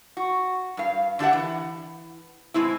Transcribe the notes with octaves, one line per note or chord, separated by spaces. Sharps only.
F#4
G2 F5
D3 D4 G4 E5 F#5
E3
B2 G#3 C4 E4